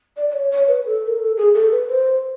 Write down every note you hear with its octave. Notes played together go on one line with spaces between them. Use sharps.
D5
D5
C#5
C#5
B4
A4
A#4
A4
G#4
A4
B4
C5